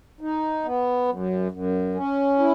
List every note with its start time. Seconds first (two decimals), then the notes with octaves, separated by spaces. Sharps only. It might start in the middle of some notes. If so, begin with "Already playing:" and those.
0.21 D#4
0.65 B3
1.08 F#2
1.52 F#2
1.95 C#4
2.39 E4